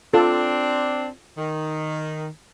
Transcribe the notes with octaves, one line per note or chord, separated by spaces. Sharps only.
C4 D4 F4 A4
D#3